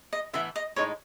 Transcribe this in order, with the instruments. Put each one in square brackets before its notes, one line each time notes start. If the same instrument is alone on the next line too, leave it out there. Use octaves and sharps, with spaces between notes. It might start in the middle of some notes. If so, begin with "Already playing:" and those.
[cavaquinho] D#5
[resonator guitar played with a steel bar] A2 E3 B3 E4 [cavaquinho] E5
[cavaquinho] D#5
[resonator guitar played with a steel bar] A2 G#3 D#4 [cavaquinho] C#5